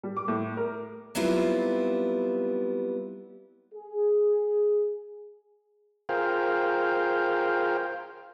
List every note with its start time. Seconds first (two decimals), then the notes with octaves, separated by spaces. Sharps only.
0.03 G3
0.17 D6
0.28 A2
0.57 A#4
1.15 F#3 G3 B3 C4 E4 F4
3.75 G#4
6.09 F4 G#4 A#4 C5 F5 G5